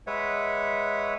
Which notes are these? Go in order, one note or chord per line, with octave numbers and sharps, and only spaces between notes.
G#3 B4 C#5 E5 F#5